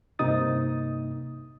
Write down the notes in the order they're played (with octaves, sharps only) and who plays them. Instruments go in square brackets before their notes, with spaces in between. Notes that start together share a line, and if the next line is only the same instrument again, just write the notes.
[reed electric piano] G2 C3 A#3 D#4 D#6 A6